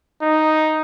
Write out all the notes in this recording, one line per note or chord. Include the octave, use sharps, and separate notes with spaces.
D#4